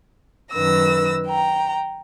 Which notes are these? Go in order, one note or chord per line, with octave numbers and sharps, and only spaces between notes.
F#2 D#3 B4 E6 A#6
G5 A#5